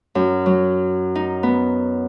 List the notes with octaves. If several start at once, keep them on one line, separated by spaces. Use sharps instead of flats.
F#2
F#3
D#4
B3